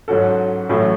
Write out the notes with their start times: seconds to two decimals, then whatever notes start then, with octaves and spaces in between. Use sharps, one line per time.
0.08 G#2 F#3 C#4 F#4 A4
0.69 A1 A2 F#3 A3